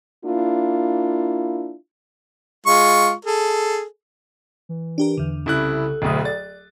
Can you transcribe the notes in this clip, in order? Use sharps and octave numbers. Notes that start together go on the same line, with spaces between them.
A#3 D4 E4 F4
G#3 F4 C#6
G#4 A4
E3
D4 G4 A#4
E2 D3
C2 C#3 E4 A4 F#6
D1 D2 B2 D#6
D5 A6